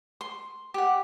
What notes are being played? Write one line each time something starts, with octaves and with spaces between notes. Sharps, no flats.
C6
G4 F#5